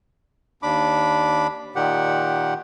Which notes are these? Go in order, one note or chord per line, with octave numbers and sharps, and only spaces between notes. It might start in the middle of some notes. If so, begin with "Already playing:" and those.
D#2 D4 B5 D6
A#2 D#3 G4 F#5